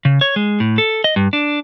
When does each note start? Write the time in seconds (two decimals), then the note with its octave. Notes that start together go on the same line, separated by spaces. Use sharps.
0.05 C#3
0.21 C#5
0.36 G#3
0.60 A2
0.78 A4
1.04 D#5
1.16 G2
1.33 D4